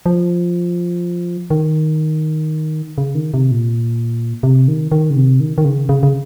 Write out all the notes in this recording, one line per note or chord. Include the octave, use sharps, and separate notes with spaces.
F3
D#3
C#3
D#3
C3
A#2
C3
D#3
D#3
C#3
C3
D#3
D#3
C#3
C#3
C#3